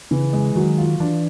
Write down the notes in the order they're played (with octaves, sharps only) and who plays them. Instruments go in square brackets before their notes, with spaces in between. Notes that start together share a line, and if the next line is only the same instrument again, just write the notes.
[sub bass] C#3 [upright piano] E3
[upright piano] G#3
[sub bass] D#3 [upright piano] F#3
[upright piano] F4
[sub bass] E3 [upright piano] D4